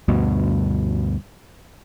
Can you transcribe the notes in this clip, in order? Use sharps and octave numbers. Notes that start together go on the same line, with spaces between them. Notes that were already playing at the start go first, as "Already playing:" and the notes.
D2 G2 B2